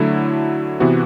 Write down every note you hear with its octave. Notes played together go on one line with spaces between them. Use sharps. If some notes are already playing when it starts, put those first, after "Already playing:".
Already playing: D3 F#3 A3 E4
C3 E3 B3 F#4